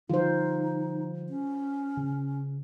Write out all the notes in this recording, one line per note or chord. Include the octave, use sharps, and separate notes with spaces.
D3 F3 G3 D#4 F4 C5
C#4
C#3